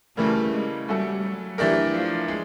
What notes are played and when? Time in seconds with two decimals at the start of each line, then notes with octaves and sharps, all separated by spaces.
0.17 C#3 E3 G3 A3 A#3
0.53 G#3
0.87 G3 A3 C#4 F#4 A4
1.23 F#3
1.58 E3 A3 D4 G4 A#4
1.94 F3
2.28 G#3